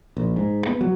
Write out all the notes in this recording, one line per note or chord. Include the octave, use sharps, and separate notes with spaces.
A#1
G#2
B3
F#3